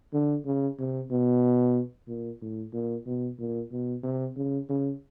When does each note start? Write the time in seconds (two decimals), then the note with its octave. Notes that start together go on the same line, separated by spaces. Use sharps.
0.13 D3
0.45 C#3
0.79 C3
1.11 B2
2.08 A#2
2.41 A2
2.73 A#2
3.06 B2
3.39 A#2
3.72 B2
4.03 C3
4.36 C#3
4.69 C#3